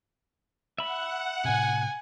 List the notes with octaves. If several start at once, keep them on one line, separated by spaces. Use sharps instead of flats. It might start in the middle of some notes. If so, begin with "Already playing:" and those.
E5 F#5 B5
A2 C3 G#5